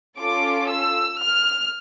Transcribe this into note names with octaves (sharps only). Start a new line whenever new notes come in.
C#4 F4 A4 D6
E6
F6